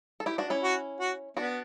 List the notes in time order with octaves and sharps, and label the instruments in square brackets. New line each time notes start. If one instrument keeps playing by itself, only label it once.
[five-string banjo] A4
E4 G4
D4 F#4
C#4 E4
[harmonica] F#4
F#4
[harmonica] B3 [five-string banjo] D4 F#4